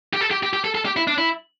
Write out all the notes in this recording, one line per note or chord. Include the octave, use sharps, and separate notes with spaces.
G4
A4
G4
G4
G4
A4
A4
G4
E4
D4
E4